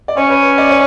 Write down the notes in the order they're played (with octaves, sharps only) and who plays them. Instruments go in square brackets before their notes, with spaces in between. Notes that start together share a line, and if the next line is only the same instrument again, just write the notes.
[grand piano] D5
[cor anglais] C#4 [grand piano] C#5
[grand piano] B4
D5
C#5